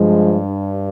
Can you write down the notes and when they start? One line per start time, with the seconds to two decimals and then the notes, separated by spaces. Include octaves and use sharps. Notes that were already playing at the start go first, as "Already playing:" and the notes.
Already playing: G2 F3 G#3